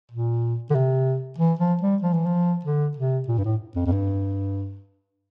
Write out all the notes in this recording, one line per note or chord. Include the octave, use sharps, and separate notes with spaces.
A#2
D3
C3
E3
F3
G3
F3
E3
F3
D3
C3
A#2
G2
A2
F2
F2
G2